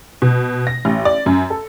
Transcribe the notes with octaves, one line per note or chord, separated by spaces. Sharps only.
B2
A#6
A1
D5
F#2
A4